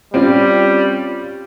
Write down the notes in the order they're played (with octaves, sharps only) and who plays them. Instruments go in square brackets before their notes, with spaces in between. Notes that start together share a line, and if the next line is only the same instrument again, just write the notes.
[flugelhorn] G3 [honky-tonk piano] C4 C#4 F4